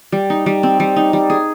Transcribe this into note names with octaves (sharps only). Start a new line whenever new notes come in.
G3
D#4
G3
C4
G3
D#4
G3
G#4